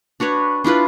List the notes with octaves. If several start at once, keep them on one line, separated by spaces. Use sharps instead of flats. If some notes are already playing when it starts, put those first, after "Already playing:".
D4 F#4 B4 C#5
D4 E4 F4 B4